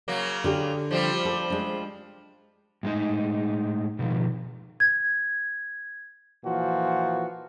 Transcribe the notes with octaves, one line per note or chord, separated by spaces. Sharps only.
C#3 F#3 A#3
D3 G4
F3 G3 C4
A4
G#3 D4
A2 G#3 D#4
B2 D#3 F3
G#6
A#2 E3 F3 F#4